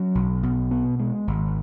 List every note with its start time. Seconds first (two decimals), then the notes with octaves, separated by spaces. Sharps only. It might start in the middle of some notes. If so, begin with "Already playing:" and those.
Already playing: F#3 C#4
0.15 B1
0.43 B2
0.71 B3
0.99 G#3
1.27 G#1